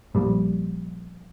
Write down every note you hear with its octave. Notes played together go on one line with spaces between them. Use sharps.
A#1 G3